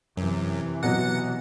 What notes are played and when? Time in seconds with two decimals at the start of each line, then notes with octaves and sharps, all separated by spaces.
0.17 F#2 C3 E3
0.83 B2 F#3 F#5